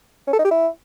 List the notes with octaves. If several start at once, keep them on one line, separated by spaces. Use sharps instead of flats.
C#4
A4
D#4
G4
E4